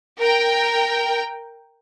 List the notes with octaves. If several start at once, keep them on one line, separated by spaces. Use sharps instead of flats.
A#4 G5